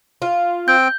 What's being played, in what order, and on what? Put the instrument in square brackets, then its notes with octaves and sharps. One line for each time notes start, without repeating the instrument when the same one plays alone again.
[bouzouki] F4
[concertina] C4 G5 [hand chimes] G6